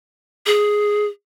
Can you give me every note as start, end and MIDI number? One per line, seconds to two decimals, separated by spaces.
0.46 1.06 68